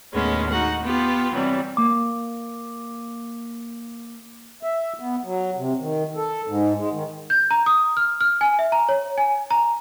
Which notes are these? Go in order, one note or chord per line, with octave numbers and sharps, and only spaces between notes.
D#2 A2 G#3 B3 C#4
D#4 F#4 F#5
B3 F4 G4
C3 E3 F#3 G3
A#3 D6
E5
B3
F#3
C3
D#3
A4
G#2
G#3
D#3
G6
A#5
D#6
F6
F6
G#5
E5
A#5
C#5
G#5
A#5